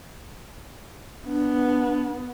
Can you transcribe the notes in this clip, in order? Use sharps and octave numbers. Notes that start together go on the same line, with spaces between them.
B3 D4